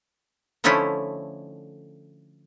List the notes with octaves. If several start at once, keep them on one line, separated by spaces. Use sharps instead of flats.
D3 F3 A3 C#4 D#4 E4